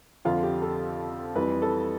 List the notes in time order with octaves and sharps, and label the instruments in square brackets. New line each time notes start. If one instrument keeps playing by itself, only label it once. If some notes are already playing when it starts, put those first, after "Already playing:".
[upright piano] F2 D3 F3 F4
G4
A4
F2 E3 G3 B4
A4